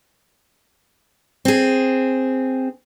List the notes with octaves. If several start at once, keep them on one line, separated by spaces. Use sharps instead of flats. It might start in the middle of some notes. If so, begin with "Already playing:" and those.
C4 G#4